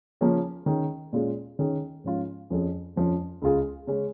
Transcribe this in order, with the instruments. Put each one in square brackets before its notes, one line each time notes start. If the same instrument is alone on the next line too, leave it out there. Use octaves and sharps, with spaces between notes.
[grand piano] C#3 F3 A#3 C#4 G#4
D#3 C#4 G#4
A#2 G#3 C#4 F4 G#4
D#3 C#4 G#4
G#2 F3 C#4 F4
F2 F3 C#4 G#4
F2 F3 C#4
C#2 C#3 G#3 F4 G#4
C#3 G#3 C#4